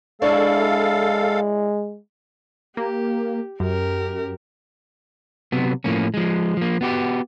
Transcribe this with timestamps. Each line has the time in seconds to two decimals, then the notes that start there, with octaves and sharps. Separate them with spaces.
0.22 G#3 D4 E4 A4 C#5 F5
2.77 A#3 G4
3.60 F#2 G4 A#4
5.52 C3 F#3 B3
5.84 A2 F3 A#3 C#4
6.14 F3 G#3
6.57 F3 A#3
6.81 B3 F#4 G4